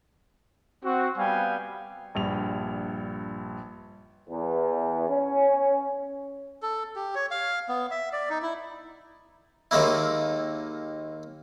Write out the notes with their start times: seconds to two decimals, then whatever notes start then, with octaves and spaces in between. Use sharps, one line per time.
0.84 C4 F#4
1.18 G3 B3 F5 G5 G#5
2.15 A#1 G2 F7
4.28 E2
5.09 C#4
6.62 A4
6.96 G4
7.15 C#5
7.31 F5
7.69 B3
7.91 E5
8.13 D5
8.30 D#4
8.42 E4
9.71 D#2 D#3 G#3 A#3 E4